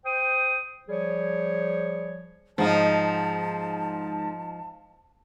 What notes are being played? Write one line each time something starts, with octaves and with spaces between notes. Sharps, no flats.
C5 G5 D#6
F3 G3 G#4 C#5
G#2 F3 D#4 A5